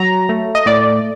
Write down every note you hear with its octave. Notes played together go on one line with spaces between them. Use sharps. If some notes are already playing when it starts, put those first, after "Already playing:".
Already playing: F#3 A#5
A3
D#5
A2 D5